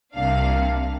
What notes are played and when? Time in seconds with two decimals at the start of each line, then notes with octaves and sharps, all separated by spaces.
0.16 C2 C3 A#3 D4 F5